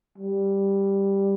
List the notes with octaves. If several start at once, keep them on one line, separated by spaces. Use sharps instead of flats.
G3